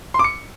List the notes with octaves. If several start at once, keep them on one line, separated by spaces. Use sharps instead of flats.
C6
D6
C#7